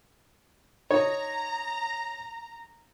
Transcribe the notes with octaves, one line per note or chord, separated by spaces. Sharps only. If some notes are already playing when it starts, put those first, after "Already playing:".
D#4 C#5 A#5